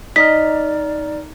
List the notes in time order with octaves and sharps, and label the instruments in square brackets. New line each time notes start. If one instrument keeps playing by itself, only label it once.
[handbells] D#4 A#5 F6 [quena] D5 [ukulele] D#5 [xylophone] B6